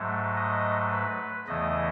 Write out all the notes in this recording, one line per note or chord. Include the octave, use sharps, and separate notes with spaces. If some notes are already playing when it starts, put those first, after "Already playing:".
Already playing: G#2 F#3 A3
D#5
B4
E2 C#3 E3 A3 D#5